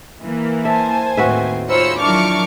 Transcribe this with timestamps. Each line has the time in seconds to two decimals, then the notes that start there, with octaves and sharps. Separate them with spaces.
0.24 E3 A#3
0.65 C5 E5 G#5 A5
1.17 D#2 A2 D#3 C4 F#4 B4 E5
1.69 D#4 F4 G#4 C5 C#5 B5 E6 C#7
2.00 D#3 F3 F#3 D4 E4 C#6 D6 F6